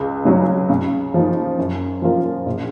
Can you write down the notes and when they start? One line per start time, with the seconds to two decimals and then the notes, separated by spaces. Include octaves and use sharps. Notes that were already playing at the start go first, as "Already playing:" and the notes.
Already playing: C#2
0.25 C#3 F#3 C#4
0.70 C#3
1.14 F3 A#3 D#4
1.58 F#2
2.02 F3 A#3 F4 A#4
2.46 A#1